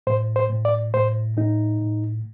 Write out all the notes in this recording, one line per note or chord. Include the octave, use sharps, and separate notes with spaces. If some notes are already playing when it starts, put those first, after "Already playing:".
A2 C5
C5
A2
D5
A2 C5
A2 D#4
A2